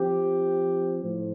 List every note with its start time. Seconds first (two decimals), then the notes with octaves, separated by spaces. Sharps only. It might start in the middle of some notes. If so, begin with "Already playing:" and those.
Already playing: F3 C4 G4
1.03 A2 F3